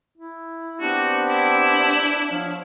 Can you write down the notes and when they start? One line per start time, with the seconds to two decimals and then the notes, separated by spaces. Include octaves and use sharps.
0.18 E4
0.81 B3 C4 D4 F#4 G4
1.29 E4
2.32 F3 C#5 F5